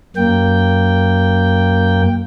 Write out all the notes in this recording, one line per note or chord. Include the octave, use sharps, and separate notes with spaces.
F#2 A#3 G5